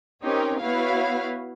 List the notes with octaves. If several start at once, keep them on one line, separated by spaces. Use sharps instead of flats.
C4 C#4 D#4 G4 A#4 C#5
B3 E4 F#4 B4 C#5 F5